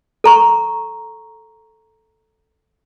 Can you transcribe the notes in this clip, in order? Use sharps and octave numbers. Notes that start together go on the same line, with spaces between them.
A4 A#5 C#6